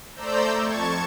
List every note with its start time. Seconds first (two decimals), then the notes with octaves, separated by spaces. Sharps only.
0.15 A3 C5 D5 A#5 E6 G6
0.60 F2 A5 C#6 G#6